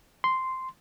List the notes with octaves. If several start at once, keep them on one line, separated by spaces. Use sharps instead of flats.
C6